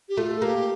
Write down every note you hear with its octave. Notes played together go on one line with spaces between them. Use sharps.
G4
A3 F4
A4
A#3 G4